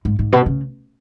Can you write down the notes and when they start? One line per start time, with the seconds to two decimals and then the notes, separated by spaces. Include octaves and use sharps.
0.05 G#2
0.19 G#2
0.32 B2
0.46 C#3